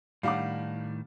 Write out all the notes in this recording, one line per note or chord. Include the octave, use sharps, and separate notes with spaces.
A2 D#3 G3 D4 F5 F#5 D6